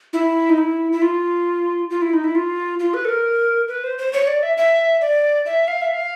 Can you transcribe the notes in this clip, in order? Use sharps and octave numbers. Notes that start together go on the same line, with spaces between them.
E4
D#4
E4
E4
F4
F4
E4
D#4
E4
F4
F4
B4
A4
A#4
B4
C5
C5
C#5
D5
E5
E5
D5
E5
F5
E5
F5